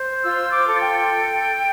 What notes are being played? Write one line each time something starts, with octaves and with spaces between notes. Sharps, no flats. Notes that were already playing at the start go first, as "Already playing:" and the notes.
Already playing: C5
F4 E6
D6
A4
G5